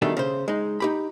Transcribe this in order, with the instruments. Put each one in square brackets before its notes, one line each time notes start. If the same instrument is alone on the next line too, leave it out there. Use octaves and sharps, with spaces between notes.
[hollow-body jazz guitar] B2 D#3 G3 A3 D4 G4
C#3 C5
G#3 D#4
D#4 G4 B5